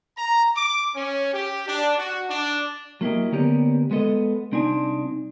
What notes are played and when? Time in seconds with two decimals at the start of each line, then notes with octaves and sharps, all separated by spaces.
0.17 A#5
0.56 D6
0.95 C#4
1.33 G4
1.67 D4
1.98 F#4
2.29 D4
3.01 F#3 A#3 E4 G4 D#5
3.32 D3 A#3 B3 C#4 G4 A#4
3.91 G#3 B3 A4 D#5
4.52 C2 C4 D4 D#4 G#5